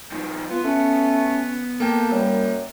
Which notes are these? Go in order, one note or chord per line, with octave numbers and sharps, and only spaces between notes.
D#3 F3
B3 F4
A3 C#4
A#3 A4 G5
F#2 G3